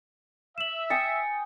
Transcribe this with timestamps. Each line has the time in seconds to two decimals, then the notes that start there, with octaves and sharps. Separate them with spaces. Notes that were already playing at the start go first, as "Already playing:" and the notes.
0.58 E5 E7 F#7
0.90 G5 G#5 D#6 A6 C#7